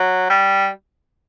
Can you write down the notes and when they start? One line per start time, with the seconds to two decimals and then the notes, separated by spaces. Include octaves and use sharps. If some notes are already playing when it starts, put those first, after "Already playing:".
Already playing: F#3
0.30 G3